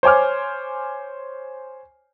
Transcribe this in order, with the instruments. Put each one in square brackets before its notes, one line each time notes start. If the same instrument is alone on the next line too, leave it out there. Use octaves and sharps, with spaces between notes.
[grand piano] C5 C#5 G#5 D6 F6